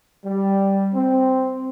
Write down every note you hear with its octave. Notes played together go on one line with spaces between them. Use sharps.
G3
C4